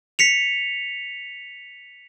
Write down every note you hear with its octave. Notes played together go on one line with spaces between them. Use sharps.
B6 C#7 F7